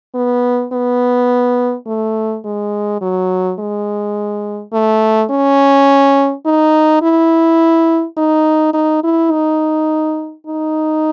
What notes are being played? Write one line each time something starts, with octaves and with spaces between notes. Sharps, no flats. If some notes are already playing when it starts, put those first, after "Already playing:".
B3
B3
A3
G#3
F#3
G#3
A3
C#4
D#4
E4
D#4
D#4
E4
D#4
D#4